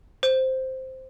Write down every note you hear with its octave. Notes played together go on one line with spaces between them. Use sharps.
C5